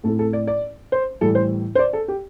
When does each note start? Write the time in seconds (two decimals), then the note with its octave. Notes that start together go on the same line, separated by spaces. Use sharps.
0.03 A2 A3 C4 E4 A4
0.19 A4
0.33 D5
0.47 D5
0.92 C5
1.21 A2 E3 G3 E4 A4
1.35 C5
1.75 C5
1.79 D5
1.93 A4
2.08 G4